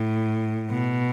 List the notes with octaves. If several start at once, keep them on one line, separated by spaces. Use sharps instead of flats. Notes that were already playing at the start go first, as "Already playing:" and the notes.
Already playing: A2
B2